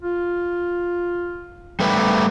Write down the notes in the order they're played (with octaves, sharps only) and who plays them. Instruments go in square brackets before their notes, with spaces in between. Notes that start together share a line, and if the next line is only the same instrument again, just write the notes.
[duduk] F4
[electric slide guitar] G3 A3 B4